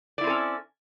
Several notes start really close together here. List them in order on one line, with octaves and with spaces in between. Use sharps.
D5 E4 C4 A4 C#4